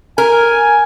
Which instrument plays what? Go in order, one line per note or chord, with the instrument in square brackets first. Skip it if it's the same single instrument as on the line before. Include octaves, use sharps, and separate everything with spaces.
[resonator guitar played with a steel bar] A#4 [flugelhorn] G#5